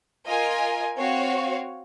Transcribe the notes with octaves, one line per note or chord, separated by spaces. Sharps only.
F4 A#4 D#5 G#5
C4 F#4 C#5 F5